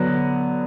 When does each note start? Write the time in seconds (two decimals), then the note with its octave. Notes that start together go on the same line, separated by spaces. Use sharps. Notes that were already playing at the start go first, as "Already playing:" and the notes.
Already playing: D3 F#3 B3 F#6 A#6